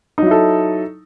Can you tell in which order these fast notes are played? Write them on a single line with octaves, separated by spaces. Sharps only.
D#4 F#3 E4 A4